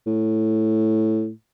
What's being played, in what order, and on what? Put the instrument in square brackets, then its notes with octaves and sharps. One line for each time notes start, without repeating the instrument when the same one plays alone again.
[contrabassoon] A2